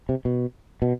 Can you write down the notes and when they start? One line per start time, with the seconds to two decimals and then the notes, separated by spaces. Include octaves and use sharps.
0.09 C3
0.25 B2
0.82 B2